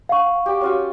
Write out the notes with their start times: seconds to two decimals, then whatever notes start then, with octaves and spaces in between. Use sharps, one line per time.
0.09 F5 F#5 C#6
0.46 G4 D5
0.61 C#4 F4 F#4